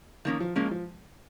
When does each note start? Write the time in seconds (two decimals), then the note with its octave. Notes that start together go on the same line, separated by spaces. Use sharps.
0.25 D#3 F3 A#3 C#4
0.40 F3
0.56 F3 G#3 A#3 C#4
0.71 F3